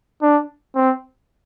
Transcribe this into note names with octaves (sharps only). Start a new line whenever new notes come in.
D4
C4